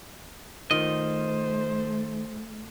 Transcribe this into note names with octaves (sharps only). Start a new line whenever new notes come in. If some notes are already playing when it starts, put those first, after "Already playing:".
D#3 A3 F4 C5 D#5